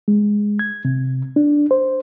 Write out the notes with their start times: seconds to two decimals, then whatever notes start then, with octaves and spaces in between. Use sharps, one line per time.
0.08 G#3
0.59 G#6
0.85 C3
1.36 D4
1.71 C5